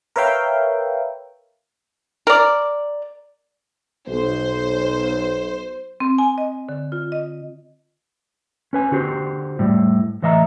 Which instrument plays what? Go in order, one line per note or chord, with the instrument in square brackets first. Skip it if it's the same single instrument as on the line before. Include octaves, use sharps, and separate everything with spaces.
[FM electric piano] A#4 B4 C#5 E5 F5 G5
[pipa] A#4 D5
[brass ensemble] B1 [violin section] C5
[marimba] C4
G#5
D#5
D3
F4
D#5
[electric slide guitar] C#4 B4 G#5
D3 F#4 G4 C5
A2 G3
A2 E3 D#5 E5 F#5 A#5